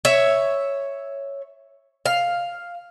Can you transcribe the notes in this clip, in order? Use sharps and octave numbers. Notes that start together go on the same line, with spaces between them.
C#5 E5
F5